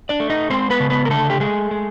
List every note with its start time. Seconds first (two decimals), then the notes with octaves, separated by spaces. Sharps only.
0.09 D4 D5
0.20 A3
0.30 D#4 D#5
0.50 G#3 C4 C5
0.70 B3 B4
0.80 C#3
0.90 B3 B4
1.05 A#4
1.10 D3 A3 A4
1.30 G4
1.40 G#3 A3 G#4
1.71 G#3